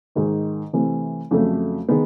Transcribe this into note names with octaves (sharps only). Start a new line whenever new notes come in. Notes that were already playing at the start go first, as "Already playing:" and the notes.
G#2 D#3 G#3
C3 E3 A3 C4
F2 C#3 F#3 A3
D#3 G#3 B3